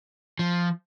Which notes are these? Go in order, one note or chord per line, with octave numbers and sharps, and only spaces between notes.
F3